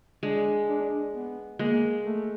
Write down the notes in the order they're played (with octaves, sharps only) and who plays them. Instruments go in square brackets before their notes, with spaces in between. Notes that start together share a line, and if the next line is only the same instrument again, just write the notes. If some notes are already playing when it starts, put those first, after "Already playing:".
[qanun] G#3 [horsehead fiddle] D4
[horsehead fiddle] D4
B3
[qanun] G#3 [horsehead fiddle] A#3
[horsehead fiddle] A3